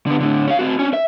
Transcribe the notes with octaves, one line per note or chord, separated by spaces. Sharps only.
D3 B3
A2 D3
C#4 F5
C4 F#4
C#4 D4
E5